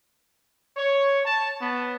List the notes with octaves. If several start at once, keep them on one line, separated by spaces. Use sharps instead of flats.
C#5
A5
B3